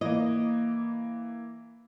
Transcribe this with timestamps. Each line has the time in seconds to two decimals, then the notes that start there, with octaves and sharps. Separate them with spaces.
0.01 E3 A#3 D#5